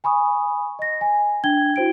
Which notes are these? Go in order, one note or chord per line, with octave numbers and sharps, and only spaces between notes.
G#5 B5 C#6 D#6
D#5 A#6
G#5
D4 G5 G#6 G7
E4 F#4 C5 G5 D7